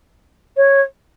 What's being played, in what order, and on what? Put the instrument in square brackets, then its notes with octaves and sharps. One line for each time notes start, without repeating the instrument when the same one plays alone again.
[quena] C#5